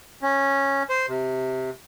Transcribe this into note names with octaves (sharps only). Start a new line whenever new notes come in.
C#4
C5
C3